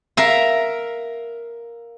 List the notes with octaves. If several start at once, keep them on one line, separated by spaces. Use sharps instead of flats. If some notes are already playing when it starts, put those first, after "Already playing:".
A#4 E5 F5